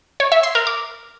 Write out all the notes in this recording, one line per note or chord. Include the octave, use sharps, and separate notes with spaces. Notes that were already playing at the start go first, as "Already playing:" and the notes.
C#5
E5
C6
A#4
D6